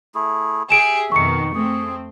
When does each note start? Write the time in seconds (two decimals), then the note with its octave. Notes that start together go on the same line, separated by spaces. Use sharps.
0.15 A3 E4 G#4
0.70 G4 G#4 E5 D7 E7
1.12 F2 B2 D#3 C#6 C#7
1.55 A3 C4 G#4